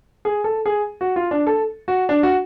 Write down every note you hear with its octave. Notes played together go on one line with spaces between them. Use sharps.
G#4
A4
G#4
F#4
F4
D4
A4
F#4
D4
F#4